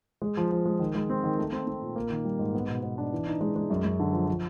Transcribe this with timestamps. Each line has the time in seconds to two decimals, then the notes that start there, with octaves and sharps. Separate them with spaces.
0.22 G#3
0.37 F3
0.52 F3
0.66 G#3
0.80 D#3
0.95 G#3
1.10 C4
1.24 D#3
1.38 A3
1.52 C4
1.67 C4
1.81 A#2
1.96 A#3
2.10 D#3
2.25 G3
2.39 G#2
2.55 B3
2.68 B2
2.83 B3
2.98 D4
3.13 E3
3.26 D#4
3.41 G#3
3.56 G#3
3.70 F#2
3.85 F#2
3.99 D3
4.13 F3
4.28 F3